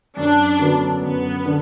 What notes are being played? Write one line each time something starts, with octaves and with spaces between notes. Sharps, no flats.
F#2 D4
D3 F#3 B3
F#2 B3
D3